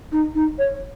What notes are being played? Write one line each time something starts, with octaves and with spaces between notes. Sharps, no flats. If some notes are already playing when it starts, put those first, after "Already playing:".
D#4
D#4
C#5